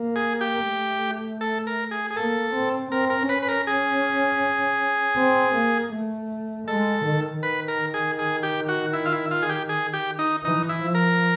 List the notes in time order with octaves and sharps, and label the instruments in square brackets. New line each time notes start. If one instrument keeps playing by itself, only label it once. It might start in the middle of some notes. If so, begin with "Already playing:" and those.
Already playing: [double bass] A#3
[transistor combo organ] G#4
G4
[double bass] A3
[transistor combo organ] A4
A#4
G#4
G#4
[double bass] A#3 [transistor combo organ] A4
[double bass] C4
[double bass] C4 [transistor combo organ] A#4
[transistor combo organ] A#4
[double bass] C#4 [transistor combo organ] B4
[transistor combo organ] B4
A#4
G#4
[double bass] C4
A#3
A3
[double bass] G#3 [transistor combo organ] A4
[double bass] D#3
[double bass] D#3 [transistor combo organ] B4
[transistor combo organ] A#4
G#4
G#4
G4
F#4
E4
F4
E4
F4
G#4
G4
G#4
G4
D#4
[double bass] E3 [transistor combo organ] D#4
[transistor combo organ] E4
[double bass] F3
[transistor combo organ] A#4